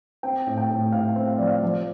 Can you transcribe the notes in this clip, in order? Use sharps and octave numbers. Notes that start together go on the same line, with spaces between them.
C4 G5
A2
G5
A2
A2 F5
C4
F5
F3 D5
F5
F3 D5